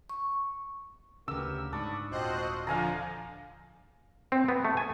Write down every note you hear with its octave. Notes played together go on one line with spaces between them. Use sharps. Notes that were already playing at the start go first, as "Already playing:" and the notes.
C#6
D2 C#3 B3 G4 A#4 E6
G#2 D4 B5 C#6 D#6
D#1 C4 F4 F#4 C5 D#5 F#6
D3 F3 F5 G#5 A#5
C4
B3
A3
G#5